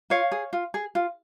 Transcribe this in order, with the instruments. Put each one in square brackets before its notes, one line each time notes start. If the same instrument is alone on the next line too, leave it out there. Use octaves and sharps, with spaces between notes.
[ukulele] F4 C#5 F5
G#4
F4
G#4
F4